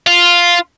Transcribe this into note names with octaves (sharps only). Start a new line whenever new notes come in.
F4